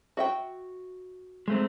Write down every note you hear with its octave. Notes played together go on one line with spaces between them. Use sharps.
F#4 E5 G5
G#3 A3 C4